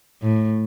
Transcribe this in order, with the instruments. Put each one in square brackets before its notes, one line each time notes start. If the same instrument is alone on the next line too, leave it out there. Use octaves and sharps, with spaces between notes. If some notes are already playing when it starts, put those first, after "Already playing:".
[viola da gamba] A2